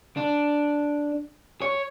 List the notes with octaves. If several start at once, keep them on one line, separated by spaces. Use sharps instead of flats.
D4
C#5